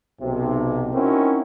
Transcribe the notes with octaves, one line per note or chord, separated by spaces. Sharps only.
B1 C3
C4 C#4 D#4 E4 F#4 A#4